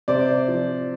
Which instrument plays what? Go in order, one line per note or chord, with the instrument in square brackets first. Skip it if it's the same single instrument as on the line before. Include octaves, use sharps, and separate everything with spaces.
[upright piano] C3 C5 D5
F3